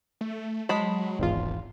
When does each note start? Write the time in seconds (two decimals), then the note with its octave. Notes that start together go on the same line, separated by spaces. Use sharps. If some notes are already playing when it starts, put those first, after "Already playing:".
0.21 A3
0.69 F#3 G#3 A5 B5
1.19 D1 G#1 E2 F4